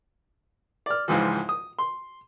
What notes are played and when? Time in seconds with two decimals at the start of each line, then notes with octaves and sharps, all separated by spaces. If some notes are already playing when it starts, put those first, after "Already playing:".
0.86 D5 F6
1.08 C#2 G#2 E3 F3
1.49 D#6
1.79 C6